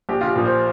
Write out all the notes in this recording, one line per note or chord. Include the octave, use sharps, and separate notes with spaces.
A#1 G4
F4
G4
A#2 F3
C5